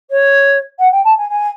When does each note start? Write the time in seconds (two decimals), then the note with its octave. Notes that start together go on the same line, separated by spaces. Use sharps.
0.10 C#5
0.79 F#5
0.91 G5
1.04 A5
1.17 G#5
1.29 G#5